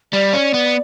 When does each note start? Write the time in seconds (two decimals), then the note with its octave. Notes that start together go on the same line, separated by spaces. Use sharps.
0.13 G3 D5
0.33 C#4
0.54 B3